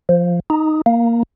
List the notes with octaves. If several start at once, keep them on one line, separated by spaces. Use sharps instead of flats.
F3
D#4
A#3